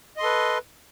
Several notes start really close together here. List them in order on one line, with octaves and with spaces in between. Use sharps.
D#5 C6 A4 B4